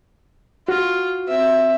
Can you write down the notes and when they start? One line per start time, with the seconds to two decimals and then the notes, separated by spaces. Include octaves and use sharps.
0.68 F4 F#4
1.28 C4 E5